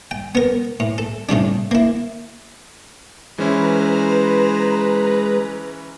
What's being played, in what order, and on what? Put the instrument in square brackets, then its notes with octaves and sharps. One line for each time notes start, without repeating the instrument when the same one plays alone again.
[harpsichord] G5
B3 A#4
A2
A4
A2 C#3 G3 D4
A#3 E4
[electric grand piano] E3 C#4 E4 [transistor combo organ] G#3 [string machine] B4 A#5 [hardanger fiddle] C5